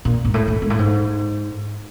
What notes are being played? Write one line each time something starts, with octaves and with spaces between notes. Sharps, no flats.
A#2
G#2
A2
A2
G#2
A2
G#2